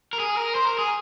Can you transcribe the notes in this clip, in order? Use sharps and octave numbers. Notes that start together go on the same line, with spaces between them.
A#4
G#4
A#4
C5
A#4
G#4